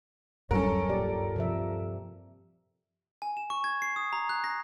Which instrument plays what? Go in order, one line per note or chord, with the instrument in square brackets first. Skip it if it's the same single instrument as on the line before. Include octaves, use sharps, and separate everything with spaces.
[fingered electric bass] D1 F#2 G3 [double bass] C#4 [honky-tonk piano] A4 A#4
[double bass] G2 [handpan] A#2 G4 D5
[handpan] C3 F3 E5
[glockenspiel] G#5
E7
C#6
G#6
C7
D#6
A#5
F#6
A#6